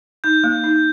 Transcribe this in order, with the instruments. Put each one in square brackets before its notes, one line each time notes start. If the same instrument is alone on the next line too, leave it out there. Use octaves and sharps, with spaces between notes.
[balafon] D#4 [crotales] G6
[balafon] A#3
D#4